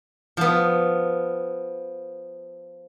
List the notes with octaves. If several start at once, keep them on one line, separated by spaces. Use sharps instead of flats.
F3 B3